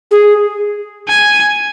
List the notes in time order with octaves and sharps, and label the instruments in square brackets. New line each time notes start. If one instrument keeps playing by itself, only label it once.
[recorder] G#4
[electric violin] G#5